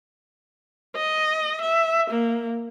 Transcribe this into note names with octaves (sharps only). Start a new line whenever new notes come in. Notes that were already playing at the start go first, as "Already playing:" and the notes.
D#5
E5
A#3